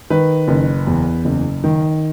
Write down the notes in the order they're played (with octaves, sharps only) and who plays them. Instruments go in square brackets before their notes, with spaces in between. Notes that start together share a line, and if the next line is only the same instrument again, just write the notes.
[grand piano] D#3 B4
F#1
E2
F#1
D#3